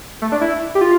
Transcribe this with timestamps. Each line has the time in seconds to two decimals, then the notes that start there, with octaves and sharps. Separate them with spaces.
0.22 A3
0.32 D4
0.41 E4
0.75 G4
0.81 F4